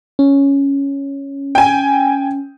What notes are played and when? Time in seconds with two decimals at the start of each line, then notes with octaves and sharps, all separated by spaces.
0.19 C#4
1.55 G5 G#5